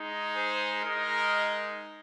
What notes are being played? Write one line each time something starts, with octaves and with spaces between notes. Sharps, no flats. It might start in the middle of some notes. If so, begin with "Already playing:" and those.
Already playing: G#3 D#4
G#4 C5
G#3 D#4 A#4 D#5